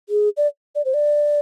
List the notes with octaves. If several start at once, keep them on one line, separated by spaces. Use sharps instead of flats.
G#4
D5
D5
C5
D5